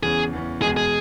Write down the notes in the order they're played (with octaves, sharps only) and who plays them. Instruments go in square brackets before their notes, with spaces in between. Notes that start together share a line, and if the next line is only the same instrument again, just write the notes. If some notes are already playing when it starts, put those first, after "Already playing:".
[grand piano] E2 C#3 E3 C#4 [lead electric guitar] G#4
[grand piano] E2 C#3 E3 C#4
[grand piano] E2 B2 G#3 [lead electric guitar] G#4
[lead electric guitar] G#4